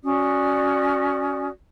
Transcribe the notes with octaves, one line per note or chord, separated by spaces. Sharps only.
C#4 F#4 D5 D#6